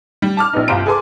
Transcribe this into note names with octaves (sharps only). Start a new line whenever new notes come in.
G3
A5 D6 F6
A#1 B3 D#4
G1 C2 F4 C5 A#5 D7
G#4 A4 B4 G#5 C6 D6